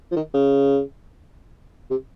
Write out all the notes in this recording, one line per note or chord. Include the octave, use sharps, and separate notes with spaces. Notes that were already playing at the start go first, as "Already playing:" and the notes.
F3
D#3
C#3
C3